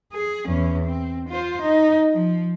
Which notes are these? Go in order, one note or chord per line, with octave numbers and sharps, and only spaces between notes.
G#4
E2 C#4
C4
F4 C5
D#4
F3